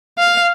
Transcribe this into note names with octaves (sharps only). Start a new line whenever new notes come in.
F5